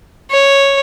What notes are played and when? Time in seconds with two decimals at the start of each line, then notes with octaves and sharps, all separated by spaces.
0.30 C#5